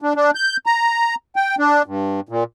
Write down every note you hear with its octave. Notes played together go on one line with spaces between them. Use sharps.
D4
D4
G6
A#5
G5
D4
G2
A#2